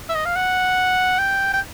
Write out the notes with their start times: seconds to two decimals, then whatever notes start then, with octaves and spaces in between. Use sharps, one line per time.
0.09 E5
0.15 D#5
0.25 F5
0.36 F#5
1.19 G5
1.54 G5